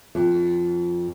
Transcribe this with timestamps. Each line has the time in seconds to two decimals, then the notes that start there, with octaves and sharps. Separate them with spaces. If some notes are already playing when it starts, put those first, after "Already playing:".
0.15 F2